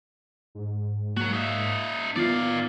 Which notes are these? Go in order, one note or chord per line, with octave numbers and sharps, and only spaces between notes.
G#2
F#3 A#3 F#4
D#4 E5
D#3 B3 F4 D5 F5